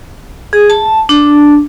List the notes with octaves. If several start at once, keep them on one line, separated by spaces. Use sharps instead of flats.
G#4
A5
D4